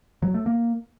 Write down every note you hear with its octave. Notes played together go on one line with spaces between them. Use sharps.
F#3
A3
A#3